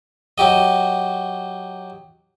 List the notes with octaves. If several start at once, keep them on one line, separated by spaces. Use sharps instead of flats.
F#3 F#4 G4 D#5